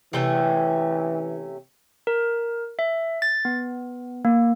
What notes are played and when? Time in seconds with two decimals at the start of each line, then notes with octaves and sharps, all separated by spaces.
0.13 C3 E3 A3 C#4
2.07 A#4
2.79 E5
3.22 A6
3.45 B3
4.25 A#3